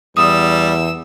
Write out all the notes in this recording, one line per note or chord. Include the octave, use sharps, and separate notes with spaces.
E2 G3 D#6 E6